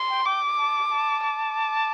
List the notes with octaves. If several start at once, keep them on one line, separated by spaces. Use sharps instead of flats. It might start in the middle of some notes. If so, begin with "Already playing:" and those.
Already playing: C6
G5
G5 D6
A5
A5
D6